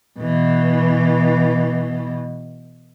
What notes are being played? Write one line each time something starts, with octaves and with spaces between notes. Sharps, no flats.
B2 E3